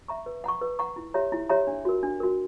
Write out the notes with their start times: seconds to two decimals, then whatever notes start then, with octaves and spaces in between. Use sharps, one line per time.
0.08 E5 A#5 C#6
0.26 B4
0.44 F#5 A#5 C#6
0.61 B4
0.79 F#5 A#5 C#6
0.96 E4
1.14 G4 C#5 E5 A#5
1.32 E4
1.49 G4 C#5 E5 A#5
1.67 D4
1.85 F#4 A#4
2.03 D4
2.20 F#4 A#4